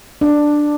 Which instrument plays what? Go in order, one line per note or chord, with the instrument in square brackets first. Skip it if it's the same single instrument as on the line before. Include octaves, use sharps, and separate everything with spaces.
[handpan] D4